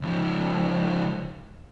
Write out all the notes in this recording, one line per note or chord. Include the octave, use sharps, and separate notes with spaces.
C#2 F3